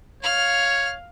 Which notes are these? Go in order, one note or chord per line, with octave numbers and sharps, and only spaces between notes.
C#5 F5 F6